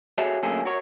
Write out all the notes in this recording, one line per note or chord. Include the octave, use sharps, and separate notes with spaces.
F#4 G#4 A4 C#5 E5
D2 F#3 A#3 C#4 G#4 A4
F#4 A#4 C#5